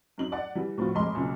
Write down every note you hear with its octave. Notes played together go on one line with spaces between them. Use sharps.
F#2 D#4 F#7
D5 F#5
E3 G3
A2 F3 B3 F4 F#4
F1 G#3 D#5 C6 D6
B1 A#2 C#3